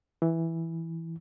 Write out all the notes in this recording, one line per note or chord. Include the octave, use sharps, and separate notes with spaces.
E3